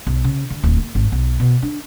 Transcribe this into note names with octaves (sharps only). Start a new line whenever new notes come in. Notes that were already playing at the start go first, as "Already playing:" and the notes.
B1
C#3
D3
D1
A#3
G#1
B1
B2
D4